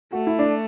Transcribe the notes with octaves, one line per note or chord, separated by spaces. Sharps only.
A3 F#4
E4
D4